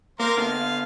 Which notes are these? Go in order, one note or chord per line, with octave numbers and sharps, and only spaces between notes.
A#3 A#4 C5 F5
D3 B3 F5